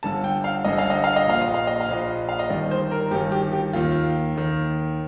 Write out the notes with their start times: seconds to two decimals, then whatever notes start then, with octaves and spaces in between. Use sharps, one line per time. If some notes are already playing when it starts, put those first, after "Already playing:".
0.03 G1 G2 D3 A5
0.24 G5
0.44 F5
0.64 G1 G2 D3 D#5
0.78 F5
0.90 D#5
1.04 F5
1.16 D#5
1.27 A#1 A#2 F5
1.41 D#5
1.54 F5
1.67 D#5
1.81 F5
1.88 A#1 A#2 D#5
2.29 F5
2.39 D#5
2.50 G1 G2 D#3 D5
2.71 C5
2.91 A#4
3.11 G1 G2 D#3 G4
3.32 G4
3.53 G4
3.73 D#2 D#3 F4
4.36 D#2 D#3